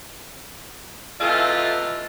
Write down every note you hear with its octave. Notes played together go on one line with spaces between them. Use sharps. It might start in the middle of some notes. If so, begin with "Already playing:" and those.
C3 E3 A3 F4 A4 D#5